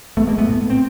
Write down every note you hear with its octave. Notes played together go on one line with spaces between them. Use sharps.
A2 A3 B3
G#3 A#3
A3 B3
A2
B3
C4